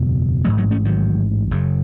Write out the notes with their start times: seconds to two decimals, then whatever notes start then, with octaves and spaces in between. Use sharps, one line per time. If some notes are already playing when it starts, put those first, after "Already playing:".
Already playing: F#1 E2 B2
0.44 A1 F#3 A3
0.48 G#2
0.57 F#3 A3
0.71 A3 C#4
0.85 D#3 F#3
1.51 F#1 F#2 C#3